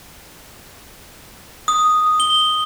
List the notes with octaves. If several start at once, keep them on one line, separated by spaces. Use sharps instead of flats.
D#6
G7